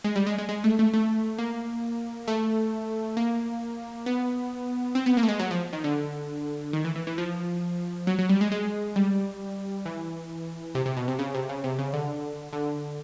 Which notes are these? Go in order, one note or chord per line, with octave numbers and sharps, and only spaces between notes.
G#3
G3
G#3
G#3
G#3
A3
A3
A3
A#3
A3
A#3
B3
C4
B3
A#3
A3
G#3
F#3
F3
D#3
D3
D#3
E3
E3
E3
F3
F#3
F#3
G3
G#3
G#3
G3
E3
C3
C3
B2
C3
C#3
C3
C#3
C3
C#3
D3
D3